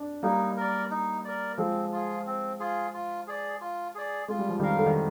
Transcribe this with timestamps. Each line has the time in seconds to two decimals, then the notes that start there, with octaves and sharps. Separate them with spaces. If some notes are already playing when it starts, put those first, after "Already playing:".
Already playing: D4
0.23 G3 A#3 D#4
0.57 A#4 D5
0.91 D#4
1.25 A#4 D5
1.58 F3 G#3 C4
1.92 F4 G#4
2.26 C4
2.60 F4 G#4
2.94 F4
3.28 G#4 D5
3.61 F4
3.95 G#4 D5
4.28 G#3 F4
4.39 G3
4.49 F3
4.60 D#3 G3 A#4 F5
4.77 D3
4.86 D#3